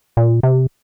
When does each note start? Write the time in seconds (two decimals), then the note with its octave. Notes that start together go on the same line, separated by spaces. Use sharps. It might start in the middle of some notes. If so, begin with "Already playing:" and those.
0.17 A#2
0.43 C3